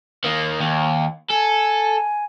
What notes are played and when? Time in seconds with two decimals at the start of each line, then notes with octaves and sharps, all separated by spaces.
0.24 D#3 A#3
0.60 D#2
1.31 A4 G#5